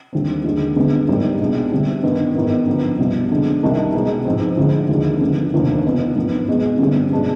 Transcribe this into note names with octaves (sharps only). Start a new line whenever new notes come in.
D#2 D3 G3 C4
D#2 D3 G#3
G1 F2 D3 G#3 B3
G#1 G#2 G3 C4 D#4
C2 B2 G#3 D4
D2 C3 G3 C4
G2 D#3 B3 D#4
G#2 D#3 B3
G2 D3 F3
C2 B2 G3
F2 D3 G#3
C2 C3 D#3 G3 D4
C2 B2 G#3 B3 D#4
G#2 F3 C4
D2 D3 F3 G#3
D#2 D3 G#3
G1 F2 D3 F3
F1 D#2 D3
F2 D#3 B3
G#1 G2 F3
B1 B2 G#3 B3
G1 G2 D3 G3 C4
B2 G#3 D4